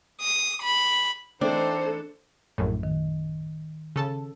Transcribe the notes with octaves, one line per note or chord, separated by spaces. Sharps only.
D#6
B5
E3 A3 C4 D4 D#4 A4 C5
A#1 F#2 A2
D#3
C#3 A4 A5